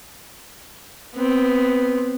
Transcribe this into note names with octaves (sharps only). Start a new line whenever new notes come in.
B3 C4